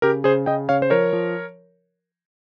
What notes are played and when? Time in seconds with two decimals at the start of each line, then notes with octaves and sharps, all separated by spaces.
0.02 C#3 G4 A#4
0.24 C#3 G#4 C5
0.46 C#3 D#5 G5
0.69 C#3 C#5 F5
0.82 C5
0.90 F3 A#4 C#5
1.13 F3